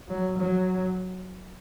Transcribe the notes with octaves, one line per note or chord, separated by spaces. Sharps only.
F#3
F#3